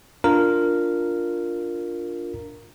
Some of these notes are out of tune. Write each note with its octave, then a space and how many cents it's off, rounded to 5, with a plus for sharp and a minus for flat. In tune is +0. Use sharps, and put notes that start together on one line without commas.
D4 +0 F4 +0 A#4 -5